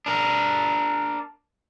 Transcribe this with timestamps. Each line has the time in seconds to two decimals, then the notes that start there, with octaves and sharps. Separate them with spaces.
0.06 D4 A#4